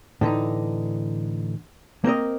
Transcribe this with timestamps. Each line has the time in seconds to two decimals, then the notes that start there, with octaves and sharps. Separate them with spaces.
0.21 A2 D3 E3 D#4
2.04 A#3 C4 A#4 D#5